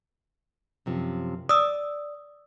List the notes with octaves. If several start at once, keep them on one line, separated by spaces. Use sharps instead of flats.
F#2 C3 F3
D5 D#6 E6